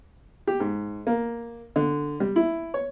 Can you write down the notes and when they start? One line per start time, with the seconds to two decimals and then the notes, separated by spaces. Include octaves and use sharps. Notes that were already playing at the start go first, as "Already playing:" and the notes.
0.47 G4
0.60 G#2
1.07 A#3
1.76 D3
2.20 G3
2.36 E4
2.74 C#5